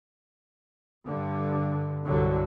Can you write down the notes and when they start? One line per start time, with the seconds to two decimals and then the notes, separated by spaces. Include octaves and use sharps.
1.05 G2 D3
2.05 C2 G2 D3 F#3